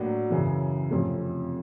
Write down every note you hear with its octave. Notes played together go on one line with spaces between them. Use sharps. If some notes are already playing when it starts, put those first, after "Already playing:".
Already playing: A2 F#3 A#3 D4 F#4
F#2 C#3 E3
F2 C3 F3 A3 C#4